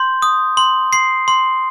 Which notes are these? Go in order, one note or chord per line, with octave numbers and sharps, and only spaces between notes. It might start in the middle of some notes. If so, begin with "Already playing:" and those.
Already playing: C6 G6
D#6
C6
C6 C7
C6